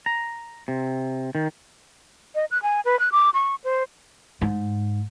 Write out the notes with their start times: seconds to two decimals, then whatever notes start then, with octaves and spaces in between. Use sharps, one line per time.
0.06 A#5
0.68 C3
1.35 D#3
2.35 D#5
2.51 F#6
2.63 G#5
2.85 B4
2.99 F#6
3.12 D6
3.34 C#6
3.64 C5
4.41 G#2